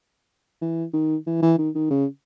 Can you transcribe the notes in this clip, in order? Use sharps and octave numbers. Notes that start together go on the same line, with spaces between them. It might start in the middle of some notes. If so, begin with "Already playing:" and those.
E3
D#3
E3
E3
D#3
D#3
C#3